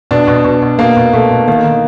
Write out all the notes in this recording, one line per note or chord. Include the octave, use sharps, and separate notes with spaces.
B2 D4
B2
B2
B2
B2 A#3
B2
B2 A3
B2
D#3 A#3
D#3